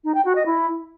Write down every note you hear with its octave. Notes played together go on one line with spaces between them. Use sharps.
D#4
G5
F#4
D#5
E4